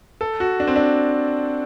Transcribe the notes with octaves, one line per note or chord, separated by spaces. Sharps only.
A4
F#4
D4
C4
D4